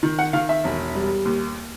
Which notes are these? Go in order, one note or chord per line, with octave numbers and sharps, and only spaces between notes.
D#3
F#5
D#3 F5
E5
E1
G3
D#2